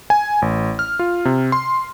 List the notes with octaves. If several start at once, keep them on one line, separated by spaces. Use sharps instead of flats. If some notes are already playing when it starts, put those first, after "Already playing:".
G#5
A1
F6
F4
C3
C6